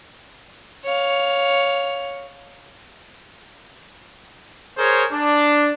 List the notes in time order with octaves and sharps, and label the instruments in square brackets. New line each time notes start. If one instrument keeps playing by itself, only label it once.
[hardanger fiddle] C#5 F5
[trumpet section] G#4 A#4 C5 C#5
D4